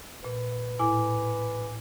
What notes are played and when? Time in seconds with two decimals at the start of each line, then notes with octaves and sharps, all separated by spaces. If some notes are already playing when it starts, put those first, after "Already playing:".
0.24 A#2 B4
0.79 A2 E4 G#5 D6